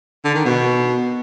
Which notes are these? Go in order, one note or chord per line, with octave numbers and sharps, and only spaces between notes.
D3
D#3
B2